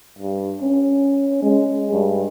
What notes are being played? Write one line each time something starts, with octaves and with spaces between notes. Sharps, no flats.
G2
C#4
G#3
G2